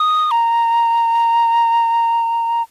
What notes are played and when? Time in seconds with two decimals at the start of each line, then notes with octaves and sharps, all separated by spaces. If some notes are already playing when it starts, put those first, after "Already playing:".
Already playing: D#6
0.31 A#5